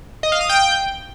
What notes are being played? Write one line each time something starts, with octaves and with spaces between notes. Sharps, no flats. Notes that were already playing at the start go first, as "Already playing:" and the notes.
D#5
F5
D#6
G5